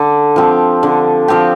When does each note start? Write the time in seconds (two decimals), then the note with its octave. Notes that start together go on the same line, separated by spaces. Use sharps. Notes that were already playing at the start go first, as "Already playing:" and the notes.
Already playing: D3
0.36 F3 C4 G4
0.83 D3
1.28 F3 C4 G4